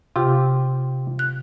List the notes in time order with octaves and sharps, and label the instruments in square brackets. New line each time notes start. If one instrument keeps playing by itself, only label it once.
[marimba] C3 [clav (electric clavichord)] F4 G4
[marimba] F#6